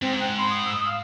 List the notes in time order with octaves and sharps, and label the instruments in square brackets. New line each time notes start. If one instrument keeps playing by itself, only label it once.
[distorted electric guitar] G#2 [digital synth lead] C4
[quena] G5 [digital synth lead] F#6
[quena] B5 [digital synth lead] C6
[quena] D#6
[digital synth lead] E6
F5